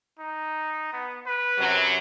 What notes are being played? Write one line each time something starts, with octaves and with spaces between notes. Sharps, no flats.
D#4
B3
B4
F#2 C3 F#3